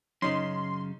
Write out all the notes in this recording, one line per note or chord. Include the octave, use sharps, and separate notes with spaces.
F#2 C#3 C#4 D#4 C6